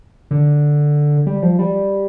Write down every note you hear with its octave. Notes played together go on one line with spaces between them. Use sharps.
D3
G3
F3
G3